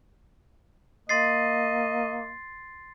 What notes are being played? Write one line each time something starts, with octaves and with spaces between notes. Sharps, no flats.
A#3 D#5 C6 A6 C7